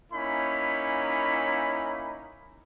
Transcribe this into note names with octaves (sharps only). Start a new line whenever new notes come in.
A#3 C#4 D#4 E4 B5